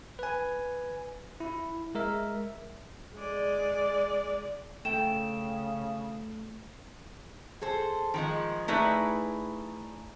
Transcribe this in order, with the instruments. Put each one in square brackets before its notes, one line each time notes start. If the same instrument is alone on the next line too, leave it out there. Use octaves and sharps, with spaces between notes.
[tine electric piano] B4 G#5
E4
G#3 A#4 E5
[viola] G#3 D5
[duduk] C#3 [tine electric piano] A3 [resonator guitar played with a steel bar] G5 [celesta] E7
[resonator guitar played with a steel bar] G#4 A4 C5
D#3 F3 G#3
A3 D#4 E4 G#4 B4 D5